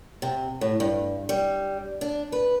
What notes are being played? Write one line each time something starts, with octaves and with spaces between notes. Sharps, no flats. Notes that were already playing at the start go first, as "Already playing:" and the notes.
C3
A2
G2
G3
D4
B4